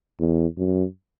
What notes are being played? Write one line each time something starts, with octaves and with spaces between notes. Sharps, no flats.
E2
F#2